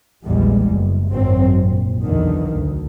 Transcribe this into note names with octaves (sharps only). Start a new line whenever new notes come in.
A#1 E2 E3 G3 G#3
F#1
G#1 F#2 F#3 C4
A#1
B1 E2 D3 D#3
D2